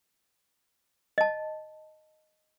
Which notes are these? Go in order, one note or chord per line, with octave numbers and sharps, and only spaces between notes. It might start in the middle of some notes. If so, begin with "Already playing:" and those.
D#5 A5